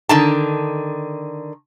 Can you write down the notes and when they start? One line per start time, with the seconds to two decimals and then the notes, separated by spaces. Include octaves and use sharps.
0.09 D3 D#3 A5